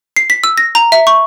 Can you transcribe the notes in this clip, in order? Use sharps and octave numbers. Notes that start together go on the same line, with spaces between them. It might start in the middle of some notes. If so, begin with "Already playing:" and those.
C7
B6
E6
A#6
A#5
E5
C#6